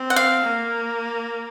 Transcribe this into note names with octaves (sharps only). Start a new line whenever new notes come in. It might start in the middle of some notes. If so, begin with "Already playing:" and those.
Already playing: C4
F#5
F5
A#3